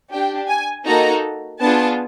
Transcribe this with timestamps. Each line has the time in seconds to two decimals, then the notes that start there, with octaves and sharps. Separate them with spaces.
0.12 D4 G4 G5
0.49 G#5
0.86 A#3 D#4 F#4 A4 A#5
1.60 B3 D4 F4 G#4 A5